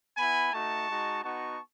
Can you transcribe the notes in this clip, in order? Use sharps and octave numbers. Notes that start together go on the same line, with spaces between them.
B3 E4 G#5 B5
A3 D#4 F#4 A5 C#6
G#3 D#4 F#4
B3 D#4 F#4 A5 C#6